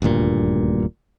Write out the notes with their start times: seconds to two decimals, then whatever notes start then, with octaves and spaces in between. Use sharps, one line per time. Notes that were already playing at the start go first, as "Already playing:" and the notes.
0.02 D#1 D2 G2 A#2